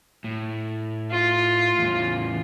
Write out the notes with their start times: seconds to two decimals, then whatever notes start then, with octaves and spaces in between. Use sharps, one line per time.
0.24 A2
1.11 F4
1.78 E2 A2